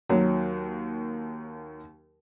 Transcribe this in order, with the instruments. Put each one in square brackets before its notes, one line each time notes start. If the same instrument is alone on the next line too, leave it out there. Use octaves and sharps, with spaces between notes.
[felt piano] D#2 F#3